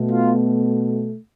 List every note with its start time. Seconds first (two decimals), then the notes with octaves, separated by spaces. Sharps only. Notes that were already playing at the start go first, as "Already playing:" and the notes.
Already playing: B2 A3
0.10 F4